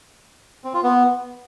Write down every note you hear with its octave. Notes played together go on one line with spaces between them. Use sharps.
C4
F4
B3